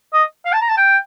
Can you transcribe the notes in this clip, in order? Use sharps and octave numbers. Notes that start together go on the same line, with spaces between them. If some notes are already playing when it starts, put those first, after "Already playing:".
D#5
F5
A5
A#5
A5
G5